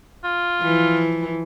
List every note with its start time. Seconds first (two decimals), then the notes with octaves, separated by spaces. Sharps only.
0.24 F4
0.62 E3 F3